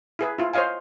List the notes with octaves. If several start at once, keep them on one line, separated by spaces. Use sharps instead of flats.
E4 G#4 B4
E4 F4
C5 C#5 D#5 F5 G#5